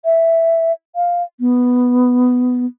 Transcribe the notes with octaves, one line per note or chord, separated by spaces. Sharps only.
E5
F5
B3